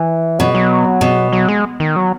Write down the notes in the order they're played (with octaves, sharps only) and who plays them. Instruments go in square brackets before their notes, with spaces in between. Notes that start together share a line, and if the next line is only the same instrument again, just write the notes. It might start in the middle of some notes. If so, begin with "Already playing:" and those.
Already playing: [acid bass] E3
[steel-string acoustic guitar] B2 [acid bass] F#3
[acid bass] F#3
[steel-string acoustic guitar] B2
[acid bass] F#3
G#3
D#3
F#3